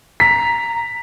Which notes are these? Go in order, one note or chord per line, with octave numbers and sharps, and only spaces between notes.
A#5 B6